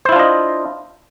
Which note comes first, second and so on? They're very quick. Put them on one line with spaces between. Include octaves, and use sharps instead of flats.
C5 E4 F4 D4 D#5